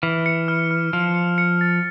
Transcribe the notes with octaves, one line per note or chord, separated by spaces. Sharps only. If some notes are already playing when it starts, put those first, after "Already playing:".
E3 F6
C#7
F6
F6
F3 F6
C#7
C#7
A6